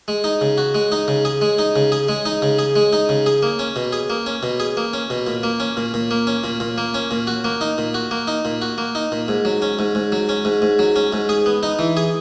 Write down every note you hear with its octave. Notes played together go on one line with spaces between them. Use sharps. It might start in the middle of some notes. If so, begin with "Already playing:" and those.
G#3
D#4
C#3
F#4
G#3
D#4
C#3
G#4
G#3
D#4
C#3
G#4
G#3
D#4
C#3
G#4
G#3
D#4
C#3
G#4
A#3
C#4
B2
G#4
A#3
C#4
B2
G#4
A#3
C#4
B2
A#2
A#3
C#4
A#2
A#2
A#3
C#4
A#2
A#2
A#3
C#4
A#2
F#4
A#3
D#4
A#2
F#4
A#3
D#4
A#2
F#4
A#3
D#4
A#2
G#2
F#3
C#4
G#2
G#2
F#3
C#4
G#2
G#2
F#3
C#4
G#2
G#4
B3
D#4
E3
G#4